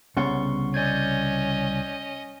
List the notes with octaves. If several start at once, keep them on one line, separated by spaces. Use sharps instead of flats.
C2 C#3 B3 F#5 C6 C#6
C#4 D5 D#5 G6 G#6